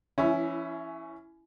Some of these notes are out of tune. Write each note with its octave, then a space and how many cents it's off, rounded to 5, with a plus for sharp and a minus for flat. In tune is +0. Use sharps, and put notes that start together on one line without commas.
E3 +40 C#4 +5 E4 +0